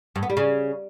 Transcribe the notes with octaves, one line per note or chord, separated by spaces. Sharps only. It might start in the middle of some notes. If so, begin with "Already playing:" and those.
G2
B3
G3
C#3